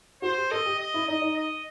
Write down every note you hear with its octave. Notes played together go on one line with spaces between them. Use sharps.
F#4 C5
G4
A4 D#5
G4
D#5
E4
D#4 D#5
D#4
D#5